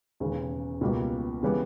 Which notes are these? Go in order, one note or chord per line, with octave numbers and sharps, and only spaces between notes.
E1 D#2 C#3
C#2 B2 G3 A#3
C#3 E3 G3 B3